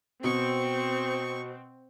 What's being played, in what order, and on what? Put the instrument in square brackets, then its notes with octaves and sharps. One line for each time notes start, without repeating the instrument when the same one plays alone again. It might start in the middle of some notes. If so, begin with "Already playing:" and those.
[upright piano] B2 [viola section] C4 [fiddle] C#6